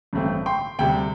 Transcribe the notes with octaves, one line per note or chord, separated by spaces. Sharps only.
A1 G2 D3 A3 C4
G5 C6
D2 C3 G3 G5